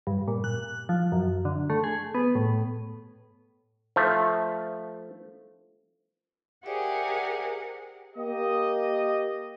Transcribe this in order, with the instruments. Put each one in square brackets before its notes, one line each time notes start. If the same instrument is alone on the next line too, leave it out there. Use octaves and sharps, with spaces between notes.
[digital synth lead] G2
A#2
F#6
F3
F#2
D3
A3
G#4
B3
A2
[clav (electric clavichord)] F3 A3
[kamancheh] G4 G#4 [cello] A#4 F#5 [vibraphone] C5 D5 E5
[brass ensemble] A#3 G4 D#5